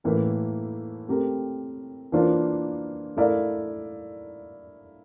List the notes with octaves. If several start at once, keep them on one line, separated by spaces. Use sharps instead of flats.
A2 E3 A#3 E4 A#4
A3 C4 G4 A#4
E3 A#3 D4 F4 C5
A3 E4 A#4 D5 F5